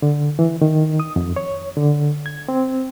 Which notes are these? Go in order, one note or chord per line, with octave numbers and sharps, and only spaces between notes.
D3
E3
D#3
D#6
F2
C#5
D3
G#6
C4